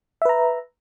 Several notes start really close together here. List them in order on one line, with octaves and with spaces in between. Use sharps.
E5 B4 A#5